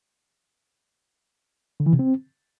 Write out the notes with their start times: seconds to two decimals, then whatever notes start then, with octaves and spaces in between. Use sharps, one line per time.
1.80 D3
1.86 E3
1.93 C3
1.99 C4